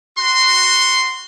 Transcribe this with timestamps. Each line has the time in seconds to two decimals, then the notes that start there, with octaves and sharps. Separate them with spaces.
0.18 F#4 C6